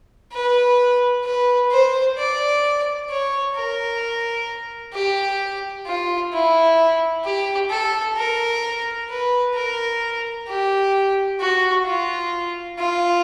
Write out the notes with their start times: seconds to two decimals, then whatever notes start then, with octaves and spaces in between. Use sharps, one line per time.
0.33 B4
1.24 B4
1.71 C5
2.17 D5
3.10 C#5
3.56 A#4
4.93 G4
5.86 F4
6.33 E4
7.24 G4
7.70 A4
8.17 A#4
9.09 B4
9.54 A#4
10.48 G4
11.40 F#4
11.85 F4
12.78 F4